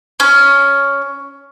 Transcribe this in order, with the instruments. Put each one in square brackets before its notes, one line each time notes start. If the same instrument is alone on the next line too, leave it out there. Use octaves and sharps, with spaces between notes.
[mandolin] C#4